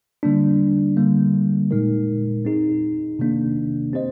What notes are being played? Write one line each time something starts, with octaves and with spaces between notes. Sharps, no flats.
D3 G3 A#3 D4
D3 G3 A#3
A#2 G#3 D#4 A#4
C4 D#4 G#4
C3 D#3 A#3 D4
C4 G4 C5 D#5